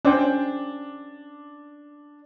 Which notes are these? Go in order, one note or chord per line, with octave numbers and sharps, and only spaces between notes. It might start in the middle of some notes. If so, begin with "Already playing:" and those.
C#4 D4 C5 G5